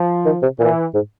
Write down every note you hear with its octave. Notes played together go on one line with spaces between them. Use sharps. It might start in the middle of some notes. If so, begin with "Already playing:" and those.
Already playing: F3
D#3
C3
A#2 E3
G#2